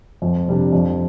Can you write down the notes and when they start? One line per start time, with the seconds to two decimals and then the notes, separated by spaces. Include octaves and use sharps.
0.22 F2
0.48 C3 G3 D4
0.72 F2